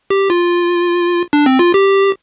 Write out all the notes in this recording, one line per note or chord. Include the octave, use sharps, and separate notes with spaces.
G4
F4
D4
C4
F4
G4